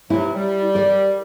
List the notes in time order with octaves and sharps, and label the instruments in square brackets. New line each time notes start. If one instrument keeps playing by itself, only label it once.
[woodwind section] C3 E3 F#3 [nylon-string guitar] E4
[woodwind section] G3
[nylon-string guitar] G4 A#4 D5